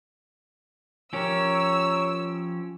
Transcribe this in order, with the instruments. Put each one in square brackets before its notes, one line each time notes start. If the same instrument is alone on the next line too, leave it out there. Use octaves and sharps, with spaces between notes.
[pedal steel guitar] F3 C#4 G4 [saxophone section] A#4 C#5 [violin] E6